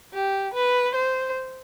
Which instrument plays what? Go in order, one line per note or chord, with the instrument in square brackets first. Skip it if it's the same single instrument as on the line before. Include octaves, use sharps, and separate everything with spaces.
[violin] G4
B4
C5